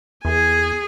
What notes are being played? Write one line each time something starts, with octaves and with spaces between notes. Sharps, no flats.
E2 G#4 G#5